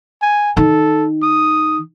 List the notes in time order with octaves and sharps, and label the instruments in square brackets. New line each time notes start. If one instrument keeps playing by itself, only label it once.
[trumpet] G#5
[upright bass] D#3 [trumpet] A4
[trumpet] D#6